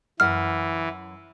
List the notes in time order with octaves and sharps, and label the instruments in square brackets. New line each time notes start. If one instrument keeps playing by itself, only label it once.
[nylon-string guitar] F#2 F#5 [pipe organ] E3 [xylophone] F6